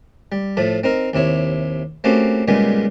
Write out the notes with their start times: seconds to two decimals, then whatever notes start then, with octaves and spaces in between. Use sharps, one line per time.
0.32 G3
0.57 A2 F3 A3
0.83 C4 D#4 A#4
1.13 D#2 C3 E4 C#5
2.04 A3 A#3 C4 C#4 F#4 G4
2.48 A#2 C#3 G3 G#3 B3